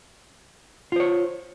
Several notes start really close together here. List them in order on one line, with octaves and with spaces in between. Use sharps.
F4 C5 C#5